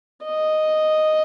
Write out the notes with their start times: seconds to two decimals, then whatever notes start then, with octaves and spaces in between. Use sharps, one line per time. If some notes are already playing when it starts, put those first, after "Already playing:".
0.25 D#5